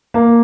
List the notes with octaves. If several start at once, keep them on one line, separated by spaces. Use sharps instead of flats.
A#3